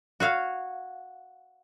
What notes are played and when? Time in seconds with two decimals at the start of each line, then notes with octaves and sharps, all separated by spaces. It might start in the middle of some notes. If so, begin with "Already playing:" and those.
0.20 F#4 C#5 F5